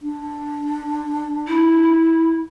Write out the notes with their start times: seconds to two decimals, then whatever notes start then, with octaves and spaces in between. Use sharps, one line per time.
0.02 D4
1.48 E4